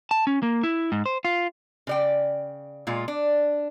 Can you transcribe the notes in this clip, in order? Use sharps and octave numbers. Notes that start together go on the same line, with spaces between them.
A5
C#4
A#3
E4
G#2
C5
F4
C#3 D5 G5
A#2 G#3 F4
D4